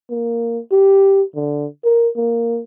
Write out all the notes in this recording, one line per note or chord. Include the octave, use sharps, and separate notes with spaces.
A#3
G4
D3
A#4
A#3